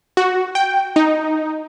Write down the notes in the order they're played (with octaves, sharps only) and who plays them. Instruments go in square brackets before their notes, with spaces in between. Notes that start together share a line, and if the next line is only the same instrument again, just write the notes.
[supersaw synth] F#4
G5
D#4